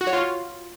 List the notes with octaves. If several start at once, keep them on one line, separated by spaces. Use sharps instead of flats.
F#4
C#5
F4